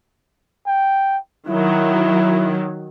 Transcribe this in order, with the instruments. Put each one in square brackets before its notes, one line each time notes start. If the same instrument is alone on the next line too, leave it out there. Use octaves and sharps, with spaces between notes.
[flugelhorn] G5
[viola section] D#3 F#3 [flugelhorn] E4